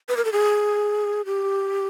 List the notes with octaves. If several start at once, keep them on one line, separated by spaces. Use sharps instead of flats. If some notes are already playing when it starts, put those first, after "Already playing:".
B4
A#4
A4
G#4
G4